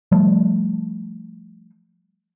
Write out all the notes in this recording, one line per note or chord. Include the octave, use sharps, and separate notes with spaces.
F3 G3 A3